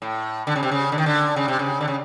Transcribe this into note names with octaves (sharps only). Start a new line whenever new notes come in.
A2
D3
C#3
C3
C#3
D3
D#3
D3
C#3
C3
C#3
D3
C#3